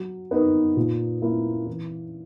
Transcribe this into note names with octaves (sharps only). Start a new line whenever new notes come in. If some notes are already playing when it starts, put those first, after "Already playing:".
Already playing: F#3
B3 D#4 A#4
A#2
A#3 E4
E3